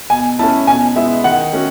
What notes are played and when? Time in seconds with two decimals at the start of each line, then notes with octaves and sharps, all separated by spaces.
0.10 B2 G#5
0.39 A3 C#4 E4 A5
0.67 B2 G#5
0.96 G#3 B3 E4 E5
1.24 D#3 F#5
1.53 A3 C#4 F#4